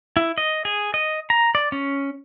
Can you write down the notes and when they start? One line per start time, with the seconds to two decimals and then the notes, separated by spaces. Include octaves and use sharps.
0.17 E4
0.38 D#5
0.65 G#4
0.94 D#5
1.30 A#5
1.55 D5
1.72 C#4